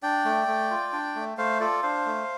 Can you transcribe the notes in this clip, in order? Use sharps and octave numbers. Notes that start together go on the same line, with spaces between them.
D4 D5 G5
A3
A3
F4
D4
A3
A3 C5 F5
F4 A4 D5
D4 C5 F5
A3